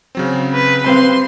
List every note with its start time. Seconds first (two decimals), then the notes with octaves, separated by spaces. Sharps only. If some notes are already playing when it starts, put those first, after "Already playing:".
0.15 C#3 F#3 C4
0.54 B4
0.86 G3 C4 B4 F5 C6